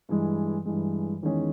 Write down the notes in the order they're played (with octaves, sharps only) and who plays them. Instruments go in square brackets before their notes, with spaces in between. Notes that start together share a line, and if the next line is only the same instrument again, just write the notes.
[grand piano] G2 E3 G#3
G2 E3 G#3
E2 D#3 G#3 C#4 G#4